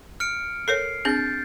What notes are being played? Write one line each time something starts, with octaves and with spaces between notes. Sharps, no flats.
F6 C#7 D7
A4 A#4 C#5 C7
C4 D4 G#4 G6 A6